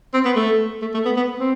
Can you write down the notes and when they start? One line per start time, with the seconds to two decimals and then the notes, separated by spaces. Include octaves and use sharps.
0.14 C4
0.25 B3
0.36 A3
0.82 A3
0.94 A3
1.05 B3
1.16 B3
1.40 C4